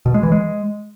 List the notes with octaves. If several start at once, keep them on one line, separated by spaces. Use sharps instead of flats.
B2
G#3
E3
G#3